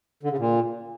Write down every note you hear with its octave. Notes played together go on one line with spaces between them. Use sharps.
D3
C#3
A#2